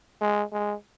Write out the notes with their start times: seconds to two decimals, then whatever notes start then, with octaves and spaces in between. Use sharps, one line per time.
0.21 G#3
0.53 G#3